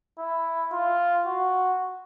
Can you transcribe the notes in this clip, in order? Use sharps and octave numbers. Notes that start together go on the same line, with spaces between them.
E4
F4
F#4